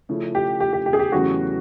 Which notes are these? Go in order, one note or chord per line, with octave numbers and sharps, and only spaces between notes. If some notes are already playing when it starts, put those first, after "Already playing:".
C#3 F3 A3 C#4 E4
G4
G4
G4
G4
G#4
G4
E2 C#3 F#3 A3 C#4 F#4